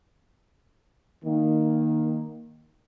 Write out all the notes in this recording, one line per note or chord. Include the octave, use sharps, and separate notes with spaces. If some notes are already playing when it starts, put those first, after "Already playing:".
D#3 A#3